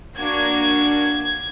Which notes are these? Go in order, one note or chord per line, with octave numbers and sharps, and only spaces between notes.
A#3 D4 F#4 G#6